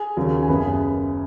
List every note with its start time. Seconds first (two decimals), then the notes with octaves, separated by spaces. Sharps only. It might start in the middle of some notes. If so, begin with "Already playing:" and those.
Already playing: G#4 G#5
0.17 D#2 C#3 F#3
0.43 G#5
0.48 F#1 F#2 C#3 B3 B4 B5
0.59 G#4 G#5